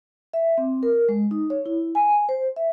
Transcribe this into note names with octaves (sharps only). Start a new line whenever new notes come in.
E5
C4
A#4
G#3
D#4
C#5
E4
G#5
C5
E5